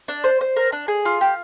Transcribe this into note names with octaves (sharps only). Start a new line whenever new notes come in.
D4
C5
C5
A#4
D4
G#4
F4
G4